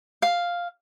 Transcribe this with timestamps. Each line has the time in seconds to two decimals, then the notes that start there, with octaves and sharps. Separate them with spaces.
0.22 F5